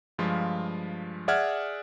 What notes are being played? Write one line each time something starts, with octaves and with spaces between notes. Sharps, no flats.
G2 F3 G#3 F4
G#4 D5 E5 F#5 F6 G#6